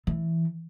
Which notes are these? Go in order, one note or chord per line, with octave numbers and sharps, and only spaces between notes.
E3